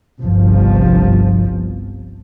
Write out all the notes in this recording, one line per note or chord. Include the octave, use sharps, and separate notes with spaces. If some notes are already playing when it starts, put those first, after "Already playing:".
G1 C2 F3